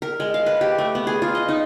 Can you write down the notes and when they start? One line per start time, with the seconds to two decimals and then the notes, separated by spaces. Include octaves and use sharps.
0.02 A#4
0.20 G#3
0.34 F5
0.46 B4
0.61 G4
0.78 A3
0.95 B3
1.07 G#4
1.22 F4
1.35 D#5
1.49 D#4